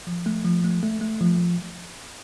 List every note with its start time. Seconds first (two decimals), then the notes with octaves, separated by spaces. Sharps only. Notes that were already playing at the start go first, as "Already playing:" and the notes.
0.07 F3
0.26 A3
0.45 F3
0.64 A3
0.83 A3
1.01 A3
1.21 F3